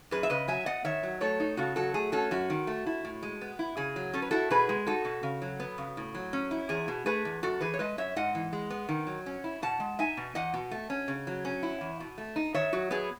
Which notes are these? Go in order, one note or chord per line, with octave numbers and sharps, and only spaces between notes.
F#2 G#4 B4
E5
C#3 B4 D#5
F#3 E5 G#5
B3 D#5 F#5
D#3 C#5 E5
F#3
A3 A4 C#5
D#4
C#3 F#4 A4
F#3 F#4 A4
A3 G#4
C#4 F#4 A4
F#2 F#4
D#3
A3
E4
A2
G#3
B3
E4
C#3 G#4
F#3
C#4 A4
B4
E4 F#4 A4
B2 G#4 B4
G#3
D#4 F#4 A4
B2
C#3
F#3
B3
C#3
A2
F#3
C#4
E4
E2 G#4
B2
A3 G#4 B4
E2
F#2 F#4 A4
E3 G#4 B4
C#5
G#3 B4 D#5
F#2 C#5 E5
G#2 D#5 F#5
E3
G#3
B3
D#3
F#3
C#4
E4
B2 F#5 A5
G#3
D#4 E5 G#5
B2
E2 D#5 F#5
B2
A3
C#4
C#3
F#3
C#4
E4
E2
B2
A3
D#4
D#3 C#5 E5
F#3 F#4
B3 G#4